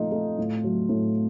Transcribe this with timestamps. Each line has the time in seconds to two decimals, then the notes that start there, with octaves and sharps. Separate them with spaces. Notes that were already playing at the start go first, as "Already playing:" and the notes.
Already playing: A#2 F3 A3 D#4 F4
0.12 A3
0.38 A2
0.64 F#3
0.89 A2